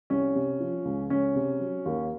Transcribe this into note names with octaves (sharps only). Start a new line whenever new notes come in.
C2 C#4
C3
F3
C#2
C#2 C#4
C3
F#3
D#2